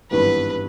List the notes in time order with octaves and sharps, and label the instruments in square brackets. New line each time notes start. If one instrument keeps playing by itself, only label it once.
[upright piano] G#1 G2 E3 G3 B3 [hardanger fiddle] B4